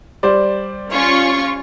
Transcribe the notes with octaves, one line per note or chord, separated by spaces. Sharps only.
G3 C5 D5
C#4 F4 C#6